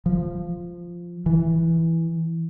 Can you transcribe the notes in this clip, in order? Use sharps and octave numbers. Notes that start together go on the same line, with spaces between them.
F3
E3